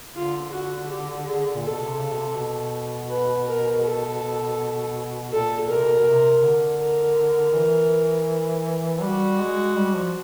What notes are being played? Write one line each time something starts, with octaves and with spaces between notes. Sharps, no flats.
D3 F4
F#4
G4
G#4
A#2
A4
B2
C3
C#3
B2
C3
B2
B4
A#4
A4
A#2 A4
B2 A#4
C3
B2
B2
C3
D3
A#4
E3
G3 F#4
G#3
G3
F3